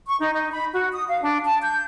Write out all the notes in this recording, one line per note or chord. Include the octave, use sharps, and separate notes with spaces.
C#6
D#4
D#4
B5
F#4
D#6
F5
D4
A5
G6